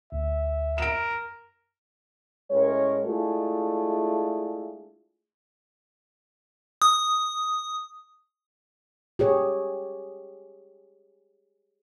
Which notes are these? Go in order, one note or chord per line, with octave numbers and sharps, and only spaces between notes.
D2 E5
A#4 D7 E7
A2 G#3 C#4 A#4 C#5
G#3 A3 D4 E4 F4 G#4
D#6
G4 G#4 C#5